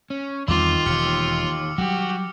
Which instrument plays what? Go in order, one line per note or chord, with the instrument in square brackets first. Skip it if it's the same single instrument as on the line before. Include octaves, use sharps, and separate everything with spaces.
[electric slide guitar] C#4
[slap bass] E2 G3 C4 [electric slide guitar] D#3 [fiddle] F4 [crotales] D6 E6
[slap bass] E1 [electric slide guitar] D#3 G4 [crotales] F6 C#7 F#7
[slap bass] F#3 G3 [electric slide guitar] F#4 [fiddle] G4